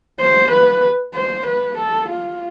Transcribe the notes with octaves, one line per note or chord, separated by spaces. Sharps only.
C5
B4
C5
B4
A4
F4